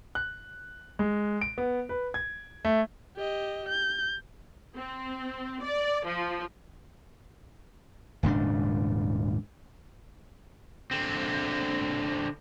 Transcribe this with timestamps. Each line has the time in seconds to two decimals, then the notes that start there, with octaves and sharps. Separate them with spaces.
0.15 F#6
0.99 G#3
1.41 D7
1.58 B3
1.89 B4
2.14 G#6
2.65 A3
3.16 G4 D#5
3.69 G6
4.76 C4
5.62 D5
6.05 F3
8.23 D#1 G#2 C#3 D4
10.91 D3 C4